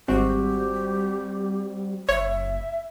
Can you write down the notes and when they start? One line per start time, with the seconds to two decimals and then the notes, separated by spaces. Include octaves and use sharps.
0.08 G#1 G3 C4 F#4 G4
2.09 F#1 C#5 E5